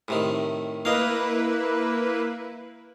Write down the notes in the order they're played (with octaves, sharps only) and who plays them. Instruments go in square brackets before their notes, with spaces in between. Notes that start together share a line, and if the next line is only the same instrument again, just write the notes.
[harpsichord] A2 C3 D#3
[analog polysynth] A#3 E4 B4 [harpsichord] D#5 F5